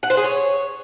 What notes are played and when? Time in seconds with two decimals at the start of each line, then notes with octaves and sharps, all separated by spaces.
0.03 F#5
0.10 C5
0.17 G#4
0.24 C#5